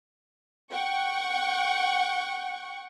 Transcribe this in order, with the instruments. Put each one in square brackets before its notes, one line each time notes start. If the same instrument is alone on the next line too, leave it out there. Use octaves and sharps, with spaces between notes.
[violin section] F#5 G5 C#6